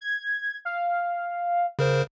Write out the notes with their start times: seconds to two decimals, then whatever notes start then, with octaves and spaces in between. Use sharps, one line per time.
0.01 G#6
0.65 F5
1.79 C#3 A#4 C5